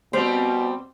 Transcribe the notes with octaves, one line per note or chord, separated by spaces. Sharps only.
B2 G3 C4 C5